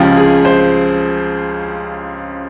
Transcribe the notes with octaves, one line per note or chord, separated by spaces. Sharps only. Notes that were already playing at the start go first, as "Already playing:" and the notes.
Already playing: C#2 C#3 F3 G4
G#4
C5